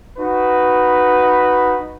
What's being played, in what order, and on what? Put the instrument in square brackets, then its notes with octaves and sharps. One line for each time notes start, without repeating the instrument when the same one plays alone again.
[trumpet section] D#4 F#4 B4